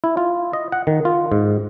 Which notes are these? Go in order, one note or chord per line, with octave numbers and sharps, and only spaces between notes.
E4
F4
D#5
F#5
D#3
F4
G#2